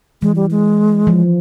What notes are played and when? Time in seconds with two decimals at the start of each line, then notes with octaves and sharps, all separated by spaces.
0.22 E3 G#3
0.36 G3
0.51 G#3
1.07 F3